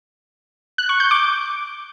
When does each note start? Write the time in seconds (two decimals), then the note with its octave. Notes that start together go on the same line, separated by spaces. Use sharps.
0.78 F#6
0.89 C#6
1.00 G6
1.11 D6